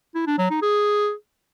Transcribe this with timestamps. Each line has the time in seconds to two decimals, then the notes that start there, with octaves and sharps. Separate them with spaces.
0.15 E4
0.27 D4
0.39 F#3
0.50 D#4
0.62 G#4